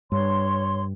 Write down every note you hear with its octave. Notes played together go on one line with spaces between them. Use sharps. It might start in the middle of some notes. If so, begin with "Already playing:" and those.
G2 C#5 C6